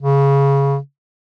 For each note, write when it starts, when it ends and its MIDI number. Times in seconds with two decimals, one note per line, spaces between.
0.01 0.77 49